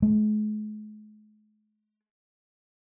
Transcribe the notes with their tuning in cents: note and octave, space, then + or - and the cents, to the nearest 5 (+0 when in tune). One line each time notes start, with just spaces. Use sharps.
G#3 +45